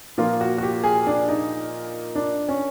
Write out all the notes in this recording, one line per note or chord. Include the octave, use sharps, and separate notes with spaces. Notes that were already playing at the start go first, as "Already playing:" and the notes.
A#2 F3 A#3 F4
F#4
F#4
G4
G#4
D4
D#4
D4
C#4